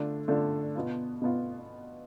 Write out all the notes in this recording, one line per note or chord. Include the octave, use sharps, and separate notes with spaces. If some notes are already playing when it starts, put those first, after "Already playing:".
Already playing: D3 A3 D4 F4
D3 A3 D4 F4
B2 B3 F4
B2 B3 F4